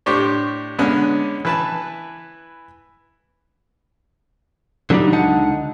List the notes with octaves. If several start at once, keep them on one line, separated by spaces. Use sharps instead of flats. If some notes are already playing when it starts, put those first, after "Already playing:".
A2 D4 G4 C5 C#5
D3 G#3 B3 C#4 D4 G#4
E3 B4 A5
D3 F#3 G3 A3 D4 D#4
C#2 D3 D#4 F#5 A5